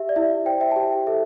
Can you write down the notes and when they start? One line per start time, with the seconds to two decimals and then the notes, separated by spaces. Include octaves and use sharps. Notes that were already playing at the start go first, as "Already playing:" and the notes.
Already playing: G4 E5
0.09 D5
0.16 E4 E5
0.46 C5 G5
0.61 E5
0.71 A5
0.76 G4 G5
1.07 A4 E5